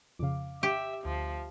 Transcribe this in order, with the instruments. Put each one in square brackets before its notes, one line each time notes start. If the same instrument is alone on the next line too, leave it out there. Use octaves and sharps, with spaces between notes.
[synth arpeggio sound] F2 C#3 [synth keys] F5 D6
[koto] G4 [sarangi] E5
[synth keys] D2 [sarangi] F3